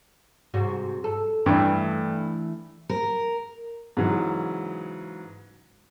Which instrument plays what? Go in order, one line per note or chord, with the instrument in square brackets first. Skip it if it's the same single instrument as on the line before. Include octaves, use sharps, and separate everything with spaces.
[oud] G#2 C3 F#4
A4
[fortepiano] G2 [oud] E3 A3 D4
[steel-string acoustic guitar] A#4
[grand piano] G#2 C#3 E3 F#3